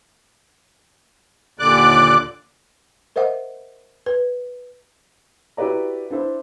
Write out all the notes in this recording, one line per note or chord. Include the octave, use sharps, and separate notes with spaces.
D#2 A#2 D3 D5 D6 F#6
A#4 C5 D#5 E5 F#5
B4
E4 F#4 G4 B4 D5 A#5
D4 E4 C5